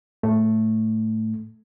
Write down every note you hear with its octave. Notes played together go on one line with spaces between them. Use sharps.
A2 A3